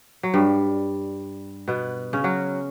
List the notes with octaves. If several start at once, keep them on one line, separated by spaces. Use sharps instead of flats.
F#3
G2 G3
B2 B3
C#3 C#4
F#3 F#4